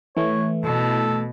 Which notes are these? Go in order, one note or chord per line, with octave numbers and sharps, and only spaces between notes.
E3 A3 C#5
B2 A4